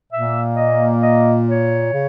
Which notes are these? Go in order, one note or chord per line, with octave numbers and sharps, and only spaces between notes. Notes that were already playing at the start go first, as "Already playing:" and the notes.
A#2 E5
A#3
D#5
D#5
C#5
C#3